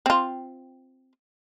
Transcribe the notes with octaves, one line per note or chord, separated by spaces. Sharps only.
C4 F4